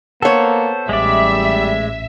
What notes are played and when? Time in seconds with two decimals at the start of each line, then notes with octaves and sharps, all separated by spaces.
0.22 A#3 B3 A4 C5 C#5
0.89 A1 G3 G#3 D5 E5